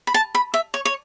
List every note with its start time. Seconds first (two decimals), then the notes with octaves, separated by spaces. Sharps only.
0.07 B5
0.14 A5
0.35 B5
0.54 E5
0.74 C#5
0.85 C#5